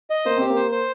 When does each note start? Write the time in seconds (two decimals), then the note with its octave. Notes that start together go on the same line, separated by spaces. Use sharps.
0.10 D#5
0.25 A#3 C5
0.37 C4 G4
0.50 A#3
0.56 C5
0.71 C5